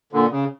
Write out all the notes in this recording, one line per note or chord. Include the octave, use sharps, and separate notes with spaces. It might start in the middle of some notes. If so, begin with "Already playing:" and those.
A#2 D3
C#3